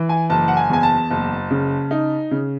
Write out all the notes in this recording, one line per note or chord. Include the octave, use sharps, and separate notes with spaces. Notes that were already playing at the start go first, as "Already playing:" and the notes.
Already playing: E3
G#5
F#1 A5
F#5
G#5
E2 G#5
A5
F#1
C#3
D#4
C#3